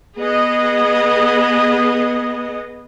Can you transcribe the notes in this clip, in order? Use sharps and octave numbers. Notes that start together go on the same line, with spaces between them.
B3 G#4 D#5